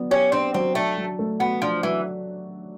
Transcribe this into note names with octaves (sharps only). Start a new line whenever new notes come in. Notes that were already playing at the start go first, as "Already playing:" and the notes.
Already playing: F#3 B3 D4
C#4 G4
C4 D4
F#3 C4
A3 D4
F#3
A3
B3 F#4
F3 D4
E3 F#3